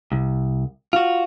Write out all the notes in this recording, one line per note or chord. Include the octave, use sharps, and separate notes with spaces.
C2
F4 F#4